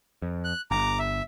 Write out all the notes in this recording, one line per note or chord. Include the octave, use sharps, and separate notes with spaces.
F2
F#6
G1 A#5 D6
E5